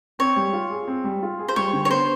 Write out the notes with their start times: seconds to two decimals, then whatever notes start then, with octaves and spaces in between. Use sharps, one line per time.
0.19 C4 C#5
0.36 G3
0.53 F4
0.71 G#4
0.88 C4
1.04 G3
1.23 F4
1.39 G#4
1.48 C5
1.56 G3 C#5
1.73 D3
1.85 C#5
1.90 B3 C5